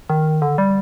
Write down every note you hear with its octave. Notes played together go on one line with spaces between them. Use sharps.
D#3
D3
G3